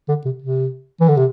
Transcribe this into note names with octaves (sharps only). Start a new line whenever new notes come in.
D3
C3
C3
E3
D3
C3